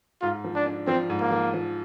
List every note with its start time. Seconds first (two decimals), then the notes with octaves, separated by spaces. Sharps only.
0.21 G#2 F4
0.44 F3
0.55 D4
0.66 D4
0.87 F3 C4
1.10 G#2
1.20 A#3
1.31 F3
1.54 F3